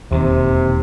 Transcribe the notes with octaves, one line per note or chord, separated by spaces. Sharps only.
E1 D#2 C3 D#3